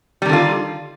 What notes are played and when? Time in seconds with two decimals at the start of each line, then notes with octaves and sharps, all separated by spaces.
0.22 G3
0.26 D#3
0.29 D3
0.33 F4